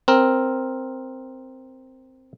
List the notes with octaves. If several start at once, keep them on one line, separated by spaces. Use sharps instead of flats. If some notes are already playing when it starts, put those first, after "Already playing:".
C4 A#4